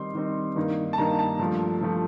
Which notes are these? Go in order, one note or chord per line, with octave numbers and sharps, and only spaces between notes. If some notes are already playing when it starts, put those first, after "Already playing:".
Already playing: D#3 G3 C4 D#4 C6
D#3 G3 C4 D#4
G2 D#3 A#3 D#4
A5
G2 D#3 A#3 D#4 A#5
A5
G2 F3 A3
G2 F3 A3